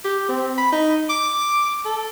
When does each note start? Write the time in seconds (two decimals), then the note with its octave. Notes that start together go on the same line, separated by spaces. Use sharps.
0.04 G4
0.28 C4
0.58 B5
0.72 D#4
1.09 D6
1.85 A4